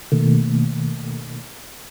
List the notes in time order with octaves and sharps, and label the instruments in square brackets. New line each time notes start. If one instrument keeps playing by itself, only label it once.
[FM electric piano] B2 D#3 A3 A#3